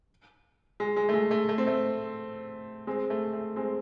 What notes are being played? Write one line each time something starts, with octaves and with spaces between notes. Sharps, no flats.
G#3
G#3
A3
G#3
A3
A3
C4
A3
G#3 C4
A3
A3
G#3 C4